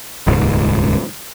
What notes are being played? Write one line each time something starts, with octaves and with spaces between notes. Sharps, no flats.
D#1 C#2 G#2